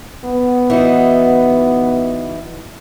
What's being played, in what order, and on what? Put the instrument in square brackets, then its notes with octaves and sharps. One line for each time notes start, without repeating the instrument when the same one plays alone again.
[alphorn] B3
[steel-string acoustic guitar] E3 D#4 F#4